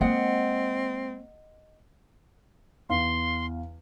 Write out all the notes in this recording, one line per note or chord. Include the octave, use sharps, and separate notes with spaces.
G#3 A#3 C4 D#5 F#5
E2 F5 C6